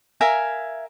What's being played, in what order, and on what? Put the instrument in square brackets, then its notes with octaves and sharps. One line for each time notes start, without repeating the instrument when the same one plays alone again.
[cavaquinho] A#4 E5 F5 G#5